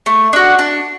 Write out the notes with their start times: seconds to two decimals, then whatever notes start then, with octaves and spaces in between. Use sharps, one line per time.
0.06 A3
0.33 D4 F#4
0.59 D4